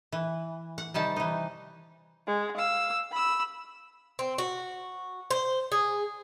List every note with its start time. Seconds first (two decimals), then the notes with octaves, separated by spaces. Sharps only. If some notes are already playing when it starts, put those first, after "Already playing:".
0.12 E3
0.78 F#5
0.94 C3 D#3 G3 A5
1.16 E3 D#4
2.27 G#3
2.57 F5 E6
3.11 B5 E6
4.19 C4
4.38 F#4
5.31 C5
5.72 G#4